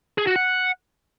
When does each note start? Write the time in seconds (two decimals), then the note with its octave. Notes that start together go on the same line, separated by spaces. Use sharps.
0.18 G#4
0.27 F#4
0.36 F#5